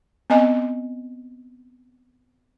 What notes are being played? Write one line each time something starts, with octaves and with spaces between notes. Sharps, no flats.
B3 C4 D#5 G#5